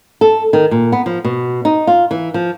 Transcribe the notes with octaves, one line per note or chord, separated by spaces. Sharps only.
A4
D#3
A#2
B3
F3
B2
D#4
F4
E3
F3